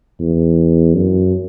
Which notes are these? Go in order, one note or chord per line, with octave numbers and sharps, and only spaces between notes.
E2
F#2